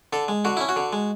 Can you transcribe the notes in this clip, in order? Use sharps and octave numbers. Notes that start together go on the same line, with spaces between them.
D3 A4
G#3
D3 F#4
C#4 E4
F#4
D3
G#3